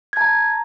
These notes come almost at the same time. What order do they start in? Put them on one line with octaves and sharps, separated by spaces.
G#6 A5 A#5